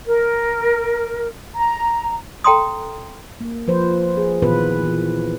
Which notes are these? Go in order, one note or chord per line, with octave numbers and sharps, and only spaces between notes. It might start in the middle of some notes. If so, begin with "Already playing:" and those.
A#4
A#5
A4 G5 A#5 C6 D#6
A#3
F3 B4 C5
G#4
A#2 D#3 E3 B3 F4 B4
E3